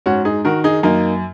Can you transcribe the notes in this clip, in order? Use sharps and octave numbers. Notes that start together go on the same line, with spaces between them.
G#2 C#4 F#4
D#4 G#4
D#3 F#4 A#4
D#4 G#4
F#2 A#3 D#4